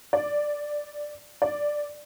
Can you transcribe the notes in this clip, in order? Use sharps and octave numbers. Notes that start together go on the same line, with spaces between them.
D5
D5